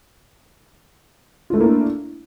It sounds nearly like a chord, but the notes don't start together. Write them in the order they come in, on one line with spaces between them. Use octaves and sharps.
F4 A3 E4 A#3 D4